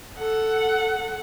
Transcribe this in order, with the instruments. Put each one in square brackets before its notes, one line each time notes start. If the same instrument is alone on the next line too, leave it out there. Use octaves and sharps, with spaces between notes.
[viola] A4 F#5